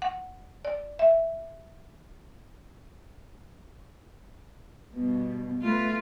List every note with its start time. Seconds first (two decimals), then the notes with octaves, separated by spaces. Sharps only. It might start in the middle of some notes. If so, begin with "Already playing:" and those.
0.02 F#5
0.65 D5
0.99 E5
4.94 G2 B2
5.62 A3 F4 B4